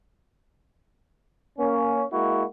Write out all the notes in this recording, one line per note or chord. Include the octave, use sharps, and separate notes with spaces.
A#3 C#4
G#3 A#3 E4 F#4